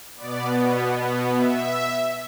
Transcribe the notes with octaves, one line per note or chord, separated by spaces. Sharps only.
B2 B3 D5
E5